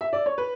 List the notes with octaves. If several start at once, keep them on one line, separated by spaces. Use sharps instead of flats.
E5
D5
C#5
B4